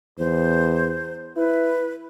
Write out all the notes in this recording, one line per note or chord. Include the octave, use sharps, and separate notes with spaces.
E2 C5
E4 B4